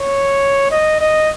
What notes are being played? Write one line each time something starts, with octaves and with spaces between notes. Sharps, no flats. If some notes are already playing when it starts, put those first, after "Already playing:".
Already playing: C#5
D#5
D#5